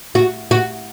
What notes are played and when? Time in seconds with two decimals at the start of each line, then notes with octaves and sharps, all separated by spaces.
0.15 F#4
0.51 F#4